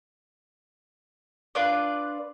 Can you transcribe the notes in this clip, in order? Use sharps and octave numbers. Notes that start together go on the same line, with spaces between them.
D4 F4 B4 D5